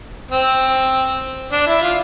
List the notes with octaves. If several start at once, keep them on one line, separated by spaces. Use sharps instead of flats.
C4
D4
E4
F4